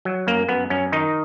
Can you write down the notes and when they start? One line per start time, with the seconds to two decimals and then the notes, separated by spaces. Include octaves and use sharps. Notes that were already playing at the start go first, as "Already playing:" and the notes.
0.05 F#3
0.27 F#2 A#3
0.49 F#2 B3
0.70 F#2 C#4
0.92 D#3 D#4